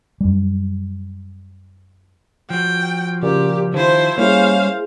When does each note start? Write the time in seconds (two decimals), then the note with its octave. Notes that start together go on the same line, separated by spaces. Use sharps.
0.21 F#2 G3
2.50 F3 F#4 G5
3.23 A#2 C#3 G4
3.74 D#3 F3 E4 C5
4.18 G3 A#3 C#4 E4 G#4 C5 F5